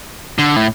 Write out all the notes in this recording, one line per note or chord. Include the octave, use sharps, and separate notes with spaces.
D3
A2